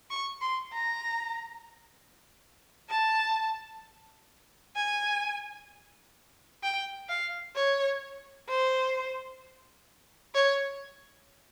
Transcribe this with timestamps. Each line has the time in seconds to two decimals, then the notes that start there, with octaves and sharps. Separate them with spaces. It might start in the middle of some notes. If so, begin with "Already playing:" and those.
0.11 C#6
0.42 C6
0.72 A#5
2.89 A5
4.76 G#5
6.63 G5
7.09 F5
7.56 C#5
8.49 C5
10.35 C#5